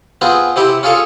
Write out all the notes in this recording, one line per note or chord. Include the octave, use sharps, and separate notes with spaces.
B3 C4 F4 G#4
C3 C4 E4 G4 C5
C#4 F4 G#4 A4 F5 C#6